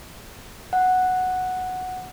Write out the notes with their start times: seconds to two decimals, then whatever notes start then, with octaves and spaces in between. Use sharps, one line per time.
0.73 F#5